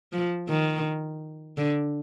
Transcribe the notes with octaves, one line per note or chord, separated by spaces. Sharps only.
F3
D#3
D3